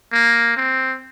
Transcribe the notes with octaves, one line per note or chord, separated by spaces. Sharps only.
A#3
C4